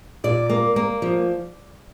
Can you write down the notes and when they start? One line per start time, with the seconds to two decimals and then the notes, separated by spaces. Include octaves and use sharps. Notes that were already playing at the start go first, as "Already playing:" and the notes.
0.24 A#2 D5
0.50 A#3
0.76 A#3
1.02 F3